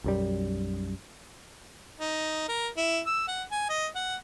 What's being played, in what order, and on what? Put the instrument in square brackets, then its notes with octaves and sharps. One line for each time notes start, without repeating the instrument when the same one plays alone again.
[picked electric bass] B1 F#2 G3
[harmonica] D#4
A#4
E4
E6
F#5
G#5
D#5
F#5